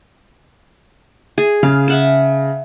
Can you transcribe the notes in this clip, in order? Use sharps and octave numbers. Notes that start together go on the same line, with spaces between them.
G#4
C#3 F5
E5 F#5 A5